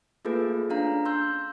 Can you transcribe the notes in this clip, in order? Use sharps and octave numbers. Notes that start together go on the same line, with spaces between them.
A3 A#3 F4 G#4 A4 B4
C#4 D4 F5 A#5
C6 E6 G6